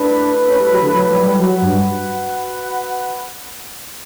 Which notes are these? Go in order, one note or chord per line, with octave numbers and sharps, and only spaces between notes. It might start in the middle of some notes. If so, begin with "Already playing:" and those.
Already playing: A3 D4 E4 B4
C#4
G3
F#3
D3
F#3
F#3
G3
F#3 F#4 B4 F#5
G2